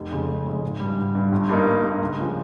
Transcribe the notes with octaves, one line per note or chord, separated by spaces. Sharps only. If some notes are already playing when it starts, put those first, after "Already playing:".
Already playing: F1
F2 C#3 G#3
F1
F2 C#3 G#3
G#1
G2 G3
G#1
G2 G3
G1
G2 G3 A#3 D#4
G1
G2 G3 A#3 D#4
C#2
C#3 F3 G#3